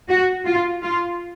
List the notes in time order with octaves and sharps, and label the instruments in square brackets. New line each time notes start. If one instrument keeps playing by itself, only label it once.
[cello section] F#4
F4
F4